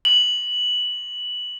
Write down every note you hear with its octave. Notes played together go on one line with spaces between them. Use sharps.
F#7